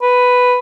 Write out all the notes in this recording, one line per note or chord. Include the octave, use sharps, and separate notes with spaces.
B4